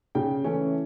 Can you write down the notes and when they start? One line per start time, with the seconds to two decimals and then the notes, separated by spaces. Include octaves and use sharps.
0.15 C#3 G5
0.44 E3 A3 C#4